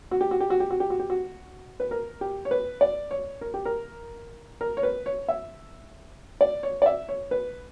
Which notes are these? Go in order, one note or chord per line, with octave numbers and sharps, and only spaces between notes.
F#4
G4
F#4
G4
F#4
G4
F#4
G4
F#4
G4
F#4
B4
A#4
G4
C#5
B4
D5
C#5
A#4
G4
A#4
A#4
C#5
B4
C#5
E5
D5
C#5
D5
E5
C#5
B4